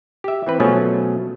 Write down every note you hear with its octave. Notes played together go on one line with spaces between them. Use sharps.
G4 E5
E3 C4 B4
B2 F3 F#3 A3 C#4 G#4